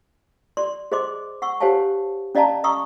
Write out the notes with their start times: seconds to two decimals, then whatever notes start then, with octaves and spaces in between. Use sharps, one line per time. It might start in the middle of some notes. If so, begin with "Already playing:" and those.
0.57 D5 C6
0.92 G#4 C5 D#5 C6 D6
1.42 F#5 C#6 E6
1.60 G4 C5 C#5 F5 G#5 A5
2.35 C#4 D5 D#5 F5 A5 A#5
2.64 D#5 A#5 C#6 D#6 E6